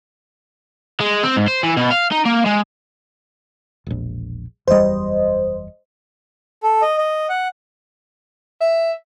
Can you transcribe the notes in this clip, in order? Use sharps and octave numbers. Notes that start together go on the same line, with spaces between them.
G#3
C4
G#2
C5
E3
B2
F5
D#4
A#3
G#3
E1 A#1
F#1 E2 G3 C5 D#5
A4
D#5
D#5
F#5
E5